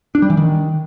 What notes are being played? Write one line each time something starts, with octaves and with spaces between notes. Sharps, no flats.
D4
G3
E3
D#3